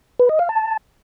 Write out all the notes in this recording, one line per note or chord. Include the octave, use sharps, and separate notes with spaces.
B4
D#5
F5
A5